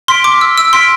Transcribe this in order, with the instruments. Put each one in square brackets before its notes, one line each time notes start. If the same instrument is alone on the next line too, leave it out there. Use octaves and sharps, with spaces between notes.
[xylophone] C6 [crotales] F6 B6 D7
[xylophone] D6
E6
E6
[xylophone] C6 [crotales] F6 B6 D7